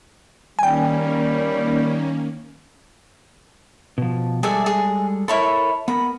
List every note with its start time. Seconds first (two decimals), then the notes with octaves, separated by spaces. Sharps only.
0.59 D#3 G3 A#3 C#4 G5 G#5
3.98 B2 F3
4.43 G3 G#3 G#4 A4 D5 E5
4.66 G#4
5.28 E4 A4 A#4 C#5 B5
5.88 B3 A#4 B5